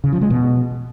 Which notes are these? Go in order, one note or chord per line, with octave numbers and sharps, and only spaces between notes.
C#3
F3
G#3
B2